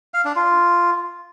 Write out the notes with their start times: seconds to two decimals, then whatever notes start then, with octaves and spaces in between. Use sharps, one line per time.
0.14 F5
0.25 D4
0.36 F4